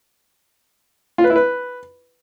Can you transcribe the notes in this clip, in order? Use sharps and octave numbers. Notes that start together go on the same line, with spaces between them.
F4
B4
E4
B4